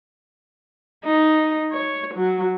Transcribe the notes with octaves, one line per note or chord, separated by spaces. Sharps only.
D#4
C#5
F#3